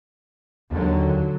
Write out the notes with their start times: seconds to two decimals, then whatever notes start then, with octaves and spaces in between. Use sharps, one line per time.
0.71 D#2 D3 F#3